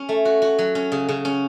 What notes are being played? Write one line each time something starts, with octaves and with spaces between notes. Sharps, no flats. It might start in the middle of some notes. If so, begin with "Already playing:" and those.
Already playing: C#4
A3
F#4
F#4
F#3
C#4
C#3
C#3
C#4